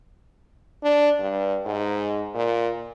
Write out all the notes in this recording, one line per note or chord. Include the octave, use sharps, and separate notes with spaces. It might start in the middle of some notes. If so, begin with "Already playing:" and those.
D4
G2
G#2
A#2